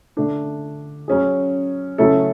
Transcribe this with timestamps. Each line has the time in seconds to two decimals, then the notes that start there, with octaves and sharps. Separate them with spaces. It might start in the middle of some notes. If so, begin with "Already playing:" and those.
0.17 D3 A3 D4
1.08 F#3 C#4 G#4
1.98 C#3 F#3 A3 E4 A4